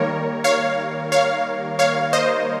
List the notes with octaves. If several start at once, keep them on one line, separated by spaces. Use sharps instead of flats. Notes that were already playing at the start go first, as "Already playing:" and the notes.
Already playing: D#3 G3 A#3 A#4 C#5
C#5 F5
C#5 F5
C#5 F5
C5 D#5